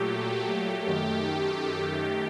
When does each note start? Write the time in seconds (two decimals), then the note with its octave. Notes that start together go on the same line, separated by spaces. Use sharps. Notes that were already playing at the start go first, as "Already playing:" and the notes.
Already playing: A#2 F#3 A3 G4
0.86 F#2 D#3 A3 G4